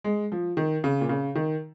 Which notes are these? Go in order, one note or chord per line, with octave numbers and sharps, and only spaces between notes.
G#3
F3
D#3
C#3
A#2
C#3
D#3